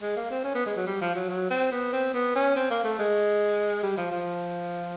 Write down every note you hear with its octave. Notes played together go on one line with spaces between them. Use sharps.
G#3
A#3
C4
C#4
B3
G#3
F#3
G3
F3
F#3
F#3
C4
B3
C4
B3
C#4
C4
A#3
A3
G#3
G3
F3
F3